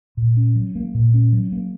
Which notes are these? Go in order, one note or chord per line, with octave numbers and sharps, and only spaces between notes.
A#2
C#4
F#3
A#3
A#2
C#4
F#3
A#3